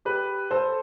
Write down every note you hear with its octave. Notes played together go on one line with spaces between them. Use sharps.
G4 B4
A4 C5